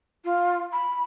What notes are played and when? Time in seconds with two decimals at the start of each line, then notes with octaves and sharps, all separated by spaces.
0.24 F4
0.73 B5